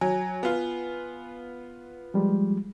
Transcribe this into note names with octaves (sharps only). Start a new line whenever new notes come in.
F#3 G#5
B3 F4
F3 G3 G#3